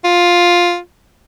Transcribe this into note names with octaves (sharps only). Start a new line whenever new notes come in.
F4